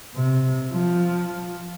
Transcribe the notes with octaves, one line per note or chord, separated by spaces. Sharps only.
C3
F3